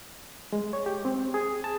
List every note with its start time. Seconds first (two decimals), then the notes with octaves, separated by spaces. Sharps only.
0.53 G#3
0.73 C#5
0.86 G4
1.05 C4
1.34 G#4
1.64 A5